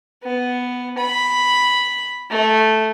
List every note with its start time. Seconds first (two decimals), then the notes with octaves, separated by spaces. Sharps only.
0.23 B3
0.98 B5
2.31 A3